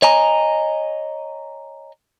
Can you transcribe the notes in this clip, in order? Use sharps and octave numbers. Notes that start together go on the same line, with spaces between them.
C#5 D#5 G#5 A#5